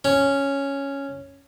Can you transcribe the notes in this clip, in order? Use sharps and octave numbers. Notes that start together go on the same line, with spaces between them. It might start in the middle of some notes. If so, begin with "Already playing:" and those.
C#4